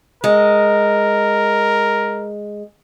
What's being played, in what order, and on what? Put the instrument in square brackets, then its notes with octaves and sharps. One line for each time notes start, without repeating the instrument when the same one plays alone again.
[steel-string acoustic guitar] G#3 [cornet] A#4